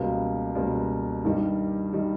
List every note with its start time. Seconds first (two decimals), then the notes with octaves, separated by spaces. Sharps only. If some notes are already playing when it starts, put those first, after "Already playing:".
Already playing: C#2 B2 G3 A#3
0.55 C#2 B2 G3 A#3
1.24 G2 D#3 G3
1.93 D#3 G3